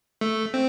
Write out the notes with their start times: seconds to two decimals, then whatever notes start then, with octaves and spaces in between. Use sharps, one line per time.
0.21 A3
0.54 C4